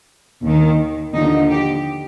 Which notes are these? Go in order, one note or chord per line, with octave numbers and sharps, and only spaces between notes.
D#2 D#3
D#2 D3 F3 D#4
G4